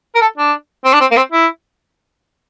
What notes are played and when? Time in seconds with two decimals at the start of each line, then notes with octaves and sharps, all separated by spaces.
0.16 A#4
0.21 A4
0.38 D4
0.85 C4
0.93 D4
1.01 C4
1.11 A#3
1.17 C4
1.32 E4